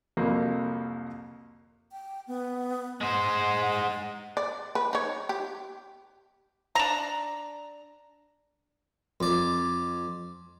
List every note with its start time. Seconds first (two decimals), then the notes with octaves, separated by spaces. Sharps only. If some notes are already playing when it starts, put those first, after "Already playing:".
0.17 C2 F2 F#3 A#3
1.92 G5
2.27 B3
3.01 G#3 C5 F#5
4.37 D5
4.75 B4
4.93 D#4 C#5
5.29 G4
6.75 D4 A#5
9.20 F2 D5